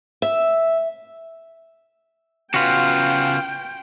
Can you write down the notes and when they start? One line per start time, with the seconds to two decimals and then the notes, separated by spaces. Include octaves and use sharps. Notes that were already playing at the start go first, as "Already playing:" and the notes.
0.22 E5
2.54 C#3 B3 F4 F#4 G5